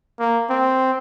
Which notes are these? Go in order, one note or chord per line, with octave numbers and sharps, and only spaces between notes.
A#3
C4